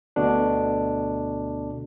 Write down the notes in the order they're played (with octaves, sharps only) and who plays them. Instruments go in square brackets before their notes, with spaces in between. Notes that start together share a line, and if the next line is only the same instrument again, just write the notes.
[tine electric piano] D2 B2 D3 D4